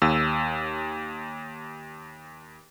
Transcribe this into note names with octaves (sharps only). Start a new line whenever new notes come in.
D#2 E6